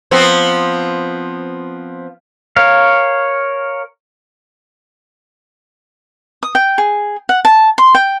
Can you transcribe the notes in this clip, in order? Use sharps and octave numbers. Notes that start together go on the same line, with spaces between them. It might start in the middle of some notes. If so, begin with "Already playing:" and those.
F3 B3 C4
A#4 C#5 F5
D#6
G5
G#4
F#5
A5
C6
G5